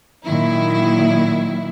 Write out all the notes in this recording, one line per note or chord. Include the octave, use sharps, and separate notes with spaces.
A#2 D#3 F#3 E4